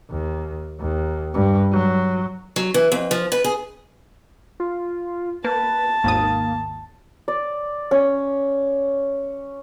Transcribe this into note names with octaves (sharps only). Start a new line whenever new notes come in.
D#2
D#2
G2
F#3
F#3
E3
F2
F3
B4
G#4
F4
A#3 B4 A5
G#1 D#2 A#3 D#6
D5
C#4